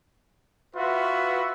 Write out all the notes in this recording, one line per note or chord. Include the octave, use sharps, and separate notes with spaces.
F4 F#4 B4 E5